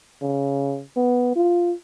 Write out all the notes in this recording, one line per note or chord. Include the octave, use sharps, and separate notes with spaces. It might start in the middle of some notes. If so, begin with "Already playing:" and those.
C#3
B3
F4